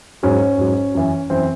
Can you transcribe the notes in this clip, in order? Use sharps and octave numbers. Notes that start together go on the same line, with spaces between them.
G#2 F#3 C#4
G#2 F#3
F#2 E3
F#2 E3 C4